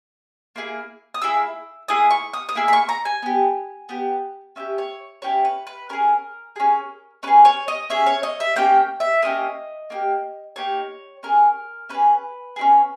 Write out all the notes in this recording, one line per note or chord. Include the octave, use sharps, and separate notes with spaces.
A#3 E4 G#4
D#6
A#3 E4 G#4 E6
A#3 E4 G#4 D#6
C#6
D#6
D#6
A#3 E4 G#4 E6
B5
C#6
A#5
G#5
B3 G4
B3 G4
C#4 E4 G4 E5
C#5
C#4 E4 G4 C#5
B4
B4
C#4 G#4 A#4
C#4 G#4
C#4 G#4 B4
C#5
D#5
C#4 G#4 E5
C#5
D#5
E5
A#3 C#4 G4 G5
E5
A#3 C#4 G4 D#5
A#3 D#4 G4
A#3 D#4 G4 C#5
C#4 G#4 A#4
C#4 G#4 B4
C#4 E4 G#4